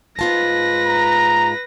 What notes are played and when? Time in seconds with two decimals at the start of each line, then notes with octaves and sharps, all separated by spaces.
0.19 G#2 F4 B4 A5 A#6
0.87 A#5